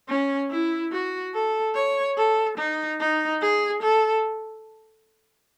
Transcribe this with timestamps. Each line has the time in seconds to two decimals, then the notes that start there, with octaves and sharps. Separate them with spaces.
0.09 C#4
0.51 E4
0.92 F#4
1.34 A4
1.75 C#5
2.18 A4
2.58 D#4
3.00 D#4
3.42 G#4
3.82 A4